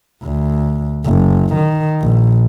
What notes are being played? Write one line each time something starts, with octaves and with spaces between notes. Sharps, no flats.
D2
F#1
D#3
A#1